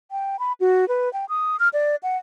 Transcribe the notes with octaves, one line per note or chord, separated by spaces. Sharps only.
G5
B5
F#4
B4
G5
D#6
F6
D5
F#5